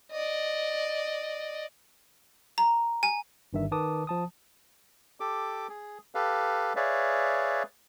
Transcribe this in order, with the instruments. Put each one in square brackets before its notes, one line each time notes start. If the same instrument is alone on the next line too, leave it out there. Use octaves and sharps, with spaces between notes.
[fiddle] D5 D#5
[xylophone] A#5
G#5
[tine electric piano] G1 G2 D#3 E5
D#3 B4 A5 D6 D#6
F3 A5 D#6
[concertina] G4 A4 D6
G#4
G4 A4 B4 F5
G#4 B4 C#5 D5 E5 F5